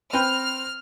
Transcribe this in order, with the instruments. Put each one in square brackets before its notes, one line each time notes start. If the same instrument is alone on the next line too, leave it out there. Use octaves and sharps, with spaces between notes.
[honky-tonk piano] C4 [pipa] B4 G5 [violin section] F6